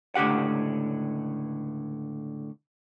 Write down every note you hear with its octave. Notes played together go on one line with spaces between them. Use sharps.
C#2 A2 D3 G4 F#5